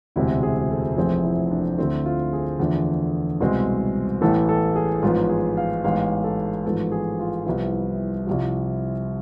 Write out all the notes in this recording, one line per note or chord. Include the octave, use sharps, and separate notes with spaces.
E1 D2 C3 G#3 C4 E4
G#4
A4
F1 F2 E3 A3 C4 G#4
E4
D4
D2 D3 A3 C4 E4
F4
G#4
E2 D3 F3 A3
C2 B2 G#3 C4
A1 A2 E3 B3 A4
A4
G#4
A1 G#2 F3 B3 F4
G#4
F5
A1 G#2 G#3 B3 F5
A4
A1 G#2 F3 B3 A4
G#4
F4
C2 C3 F3 B3 E4
C2 C3 F3